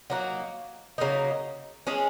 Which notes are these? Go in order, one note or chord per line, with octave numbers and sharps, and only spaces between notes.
F#3 A#3 D#4 F#4
C#3 F#3 A#3 D#4
G#3 C#4 G#4